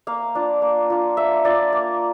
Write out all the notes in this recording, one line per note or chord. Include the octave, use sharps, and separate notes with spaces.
A#3 F5
D4 F4
A#3
D4 F4
A#3 E5
D4 F4 D5
A#3